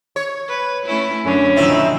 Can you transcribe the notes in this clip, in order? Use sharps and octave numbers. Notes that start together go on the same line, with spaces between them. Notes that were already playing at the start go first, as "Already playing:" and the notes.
C#5
B4
A3 C#4 E4
F#2 D3 C#4 D4
F2 B2 D3 D#3 C4 E4